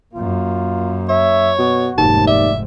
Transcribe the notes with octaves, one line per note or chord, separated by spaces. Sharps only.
F#2 A#3 F4
C#5 E5
B2 F#4
F1 D#2 G#2 A5
D5 E5